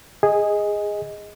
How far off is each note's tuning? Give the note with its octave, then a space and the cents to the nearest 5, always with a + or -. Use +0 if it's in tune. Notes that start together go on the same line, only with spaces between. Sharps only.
G#4 -10 D#5 +5